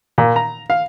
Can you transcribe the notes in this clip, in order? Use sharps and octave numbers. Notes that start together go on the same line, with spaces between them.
A#2
A#5
F5